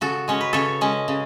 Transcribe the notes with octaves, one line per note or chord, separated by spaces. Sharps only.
C#3 F#4 A4
G#3 C#4 C#5
B4
C#3 A4 C#5
G#3 C#4
C#3